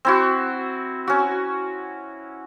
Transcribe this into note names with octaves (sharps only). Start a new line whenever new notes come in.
C4 E4 F#4
C#4 F#4